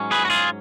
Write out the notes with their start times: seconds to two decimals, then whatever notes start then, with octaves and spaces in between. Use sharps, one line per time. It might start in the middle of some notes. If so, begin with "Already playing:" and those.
Already playing: G#2 F#3 C#4
0.11 G#4 B4
0.25 F#4
0.30 F4 G#4